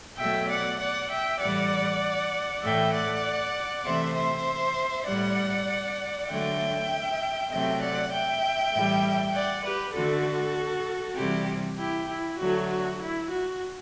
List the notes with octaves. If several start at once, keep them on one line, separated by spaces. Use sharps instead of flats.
B2 F#3 A3 E5 G5
D5 F#5
D5 F#5
E5 G5
A2 E3 G3 D5 F#5
A2 E3 A3 E5 G5
D5 F#5
C3 E3 A3 C5 E5
C5 E5
A2 G3 D5 F#5
D3 F#3 A3 E5 G5
C3 F#3 A3 E5 G5
D5 F#5
E5 G5
A2 E3 G3
D5 F#5
G4 B4
D3 A3 F#4 A4
C3 E3 G3 E4 G4
E4 G4
E4
D3 F#3 A3 F#4
F#4
E4
F#4